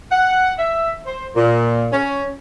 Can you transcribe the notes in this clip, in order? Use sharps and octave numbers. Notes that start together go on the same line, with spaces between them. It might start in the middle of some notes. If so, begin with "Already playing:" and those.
F#5
E5
C5
A#2
C#4